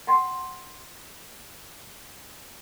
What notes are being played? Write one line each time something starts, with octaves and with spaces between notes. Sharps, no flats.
F#5 G5 C6